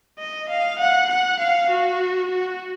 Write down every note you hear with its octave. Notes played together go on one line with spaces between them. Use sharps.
D#5
F5
F#5
F#5
F5
F#4
F#4